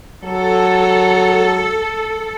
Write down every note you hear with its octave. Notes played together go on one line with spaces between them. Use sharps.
F#3 A4